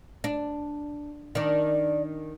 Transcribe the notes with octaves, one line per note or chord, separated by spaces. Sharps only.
D4
D#3 D4 D5